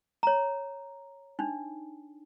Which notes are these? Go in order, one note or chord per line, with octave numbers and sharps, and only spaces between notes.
C#5 A#5
D4 D#4